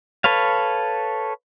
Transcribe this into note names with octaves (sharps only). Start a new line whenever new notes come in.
A4 B4 C#5 F5